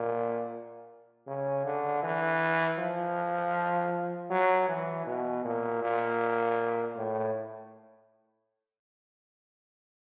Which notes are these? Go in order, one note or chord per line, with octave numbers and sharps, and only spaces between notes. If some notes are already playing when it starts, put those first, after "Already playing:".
Already playing: A#2
C#3
D3
E3
F3
F#3
E3
B2
A#2
A#2
A2